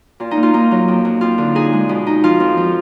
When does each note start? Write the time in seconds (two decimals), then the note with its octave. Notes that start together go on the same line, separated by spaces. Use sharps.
0.20 A#2 F4
0.31 D#4
0.37 A#3
0.43 F4
0.54 A#3 D#4
0.71 F#3
0.88 F2
1.05 F2
1.21 F2 F4
1.38 D3
1.55 D#4 G#4
1.73 G#3
1.89 B2
2.07 D#4
2.24 F3 F4
2.40 F2
2.57 F3